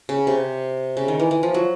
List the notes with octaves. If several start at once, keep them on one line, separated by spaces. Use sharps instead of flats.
C#3
C3
C#3
D#3
E3
E3
F3
F#3